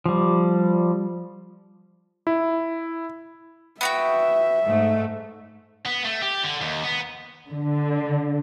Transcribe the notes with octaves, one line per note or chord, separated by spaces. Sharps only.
F3 G3
E4
B3 F#4 E5 G5
G#2 A3
B3
A3
G4
D3
D#2
B3
D3